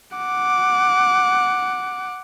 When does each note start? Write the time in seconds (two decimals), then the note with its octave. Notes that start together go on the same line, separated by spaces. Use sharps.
0.17 F#5 D6